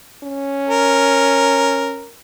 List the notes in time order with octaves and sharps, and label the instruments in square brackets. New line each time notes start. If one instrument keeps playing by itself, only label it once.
[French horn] C#4
[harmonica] A#4